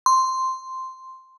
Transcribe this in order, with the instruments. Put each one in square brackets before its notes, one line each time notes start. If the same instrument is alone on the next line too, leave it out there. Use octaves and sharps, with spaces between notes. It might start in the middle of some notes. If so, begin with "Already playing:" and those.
[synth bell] C6